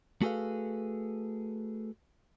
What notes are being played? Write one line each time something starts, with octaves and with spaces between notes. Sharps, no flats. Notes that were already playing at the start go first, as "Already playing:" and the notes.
A3 F#4 G#4 A4 B4 F5